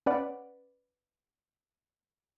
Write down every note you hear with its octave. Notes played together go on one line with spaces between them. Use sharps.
C#4 B4 D5 F#5